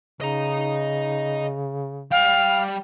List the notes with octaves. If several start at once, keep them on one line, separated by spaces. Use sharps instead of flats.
C#3 D#5 A#5
G3 F5 G5